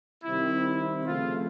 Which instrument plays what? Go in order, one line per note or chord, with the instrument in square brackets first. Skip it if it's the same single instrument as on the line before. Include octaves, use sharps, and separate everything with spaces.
[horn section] C3 D#3 G3 C4 E4
C#3 F3 A3 C4 F4